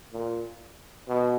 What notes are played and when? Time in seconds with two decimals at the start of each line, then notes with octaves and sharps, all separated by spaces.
0.13 A#2
1.08 B2